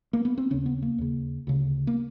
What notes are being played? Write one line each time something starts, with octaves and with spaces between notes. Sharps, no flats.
A#3
B3
C4
D#2 C#3 C#4
B3
A#3
D#2 C#3
D2 C#3
A#3